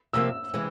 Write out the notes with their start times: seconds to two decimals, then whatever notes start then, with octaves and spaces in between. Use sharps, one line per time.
0.13 C3 F3 A#3 E6
0.54 C3 E3 G#3 C4